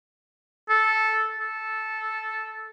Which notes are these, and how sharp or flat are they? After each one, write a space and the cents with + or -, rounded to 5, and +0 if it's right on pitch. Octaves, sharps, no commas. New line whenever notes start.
A4 -10
A4 -10